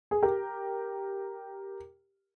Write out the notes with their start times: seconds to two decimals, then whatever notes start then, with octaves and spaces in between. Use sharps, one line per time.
0.11 G#4
0.23 G4 A#4